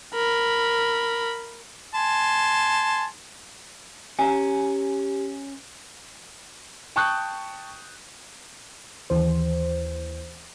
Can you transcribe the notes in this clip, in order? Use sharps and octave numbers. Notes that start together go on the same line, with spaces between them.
A#4 B5
G#5 A5 C6
C#4 G4 G#5 A#5
G5 A5 C#6 D#6 F#6 G6
D#2 E3 C5